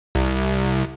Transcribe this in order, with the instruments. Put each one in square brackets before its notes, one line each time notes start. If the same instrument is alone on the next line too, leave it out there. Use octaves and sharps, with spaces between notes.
[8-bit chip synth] C2